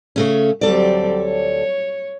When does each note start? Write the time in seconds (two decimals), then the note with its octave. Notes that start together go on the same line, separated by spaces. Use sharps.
0.16 C#3 A3 C#4
0.61 D2 F#3 G3 C4 A4 D5
1.24 C#5